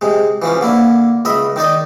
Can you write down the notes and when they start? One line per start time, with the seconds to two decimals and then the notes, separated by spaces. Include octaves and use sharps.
0.01 C3 G#3
0.42 E3 F3 C#4
0.61 D3 A#3 E4
1.25 C#2 D#5 E5 B5
1.56 D#3 D#4 D5 D#5